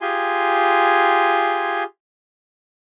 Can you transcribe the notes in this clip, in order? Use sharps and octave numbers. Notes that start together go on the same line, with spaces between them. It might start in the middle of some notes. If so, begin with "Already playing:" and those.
F4 G4 G#4 G#5 C6